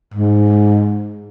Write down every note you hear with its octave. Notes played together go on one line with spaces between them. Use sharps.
G#2